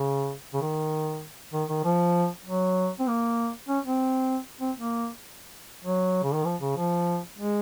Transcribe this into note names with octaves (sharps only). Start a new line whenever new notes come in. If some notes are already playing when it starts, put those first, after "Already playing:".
Already playing: C#3
C#3
D#3
D#3
D#3
F3
F#3
C4
A#3
C#4
C4
C4
A#3
F#3
C#3
D#3
F3
C#3
F3
G#3